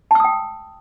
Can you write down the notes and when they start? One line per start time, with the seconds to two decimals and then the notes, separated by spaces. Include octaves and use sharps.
0.11 A5
0.15 E6
0.20 D#6
0.24 G5